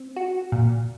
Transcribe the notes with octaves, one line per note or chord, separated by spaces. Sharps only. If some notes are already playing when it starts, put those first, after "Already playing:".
Already playing: C4
F#4
A#2